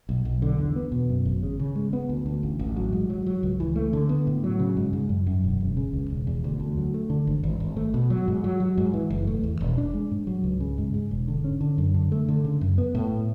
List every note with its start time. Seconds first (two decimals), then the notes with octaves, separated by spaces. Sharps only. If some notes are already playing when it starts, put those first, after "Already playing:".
0.09 B1
0.25 B1
0.42 D3
0.58 E2
0.76 B3
0.92 B2
1.09 F#2
1.26 G#1
1.43 C#3
1.59 C#3
1.75 G#3
1.93 B3
2.09 D2
2.26 D2
2.43 A1
2.59 A1
2.77 F#3
2.93 G#2
3.10 F#3
3.26 F#3
3.43 C#2
3.60 E3
3.76 A3
3.93 D3
4.09 B3
4.27 A2
4.44 F#3
4.59 C#3
4.77 G#2
4.93 G#2
5.09 F#2
5.27 F#2
5.44 E1
5.61 E1
5.77 C#3
5.93 C#2
6.10 E1
6.27 E2
6.44 D2
6.60 D2
6.77 F#3
6.94 A3
7.10 D3
7.27 G#1
7.43 G#1
7.60 G#1
7.76 A3
7.94 B2
8.10 F#3
8.28 G#2
8.44 F#3
8.60 F#3
8.78 G#2
8.93 E3
9.10 F#1
9.27 A3
9.43 E2
9.61 E1
9.78 D4
9.94 G#3
10.11 G#2
10.27 F#3
10.44 C#2
10.60 C#3
10.78 G#2
10.94 G#2
11.11 E1
11.28 D3
11.44 C#4
11.61 D3
11.78 F#2
11.94 D3
12.12 A3
12.28 D3
12.44 C#3
12.61 F#2
12.78 B3
12.95 A2